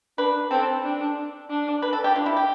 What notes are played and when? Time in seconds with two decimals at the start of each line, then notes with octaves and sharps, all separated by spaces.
0.18 D4 B4
0.51 C4 A4
0.84 D4
1.50 D4
1.82 B4
1.93 A4
2.04 G4
2.15 D4 F4
2.26 E4
2.37 G4